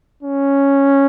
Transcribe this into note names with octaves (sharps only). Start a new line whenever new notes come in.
C#4